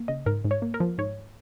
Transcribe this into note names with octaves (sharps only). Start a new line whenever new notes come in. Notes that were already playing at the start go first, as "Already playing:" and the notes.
Already playing: A#3
C#3 D#5
G#2 A#4
G#2
C#5
A#3
A#4
F3
G#2 C#5